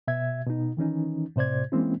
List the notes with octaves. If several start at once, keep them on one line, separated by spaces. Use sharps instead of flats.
B2 E5 G#6
B2 D#4
D#3 E3 C#4 D#4
A2 C3 C5 D5 G#6
E3 G#3 A#3 C4 C#4 E4